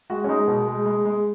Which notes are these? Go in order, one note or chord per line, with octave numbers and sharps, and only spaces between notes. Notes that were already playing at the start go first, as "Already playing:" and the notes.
G#3 F#4
C#4
G#3 D#4
B2
G#3
G#3
G#3